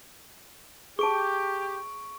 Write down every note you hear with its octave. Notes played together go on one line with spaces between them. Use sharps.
G4 G#4 A5 C#6 D7